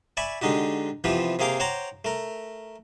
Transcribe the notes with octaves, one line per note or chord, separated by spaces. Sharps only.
D5 E5 G#5 B5 C#6
D3 G#3 D#4 F#4 G4
C3 E3 F3 B3 C4 G4
C3 A#3 G#4 F5 G5 D6
C5 C#5 F#5 G5 A#5 D6
A3 A#4